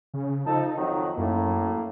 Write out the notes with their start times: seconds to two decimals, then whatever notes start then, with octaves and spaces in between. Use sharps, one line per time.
0.14 C#3
0.47 F3 D#4 A4
0.77 F2 D#3 F#3
1.18 F#2 A2 A#3